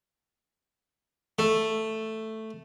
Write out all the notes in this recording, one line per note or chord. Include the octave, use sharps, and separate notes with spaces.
A3